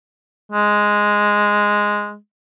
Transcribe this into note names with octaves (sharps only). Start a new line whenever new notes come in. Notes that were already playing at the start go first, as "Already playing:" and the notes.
G#3